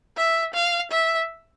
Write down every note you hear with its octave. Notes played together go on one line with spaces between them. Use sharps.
E5
F5
E5